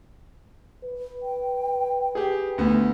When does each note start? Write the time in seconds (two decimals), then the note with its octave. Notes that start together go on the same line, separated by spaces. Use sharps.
0.83 B4
1.22 G5
2.15 G4 G#4
2.58 D2 A3 B3